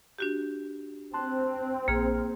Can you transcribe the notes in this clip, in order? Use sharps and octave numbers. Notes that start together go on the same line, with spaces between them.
D4 F#4 G4
C4 A5 C6 F#6
A#1 A#3 G#4 F6